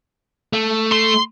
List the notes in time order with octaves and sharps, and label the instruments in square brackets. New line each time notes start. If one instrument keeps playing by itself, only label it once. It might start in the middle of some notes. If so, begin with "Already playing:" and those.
[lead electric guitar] A3
[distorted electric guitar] C6